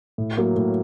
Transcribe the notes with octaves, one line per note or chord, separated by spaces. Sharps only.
A2
F#3 A#3
A2